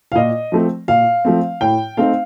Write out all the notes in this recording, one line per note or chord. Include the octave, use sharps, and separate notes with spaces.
F5
A#2 D#5
F3 A3 C4
A#2 F5
F3 A3 C4
A2 G5
A3 C4 D#4 F5